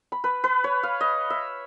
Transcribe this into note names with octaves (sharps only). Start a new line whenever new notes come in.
B5
B4
B4
C#5
F5
D#5
E5